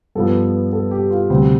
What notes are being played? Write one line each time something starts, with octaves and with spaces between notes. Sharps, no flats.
G2 F3 B3 A4
A4
G4
F4
D2 C3 G3 C4 C5